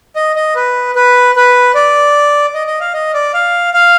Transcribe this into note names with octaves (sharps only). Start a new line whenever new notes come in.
D#5
D#5
B4
B4
B4
D5
D#5
D#5
F5
D#5
D5
F5
F5